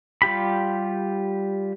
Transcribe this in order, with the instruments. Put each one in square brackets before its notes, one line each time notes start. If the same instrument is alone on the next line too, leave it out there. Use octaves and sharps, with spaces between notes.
[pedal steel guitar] G3 F4 G4 B5